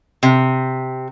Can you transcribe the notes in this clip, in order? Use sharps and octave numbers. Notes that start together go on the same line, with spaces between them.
C3